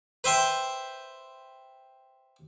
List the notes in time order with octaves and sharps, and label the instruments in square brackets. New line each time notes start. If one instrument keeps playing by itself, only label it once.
[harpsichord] B4 C5 E5 G5 C6